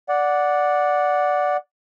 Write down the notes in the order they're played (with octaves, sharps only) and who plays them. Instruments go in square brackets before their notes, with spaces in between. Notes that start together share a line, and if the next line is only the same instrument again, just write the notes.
[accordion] D5 F#5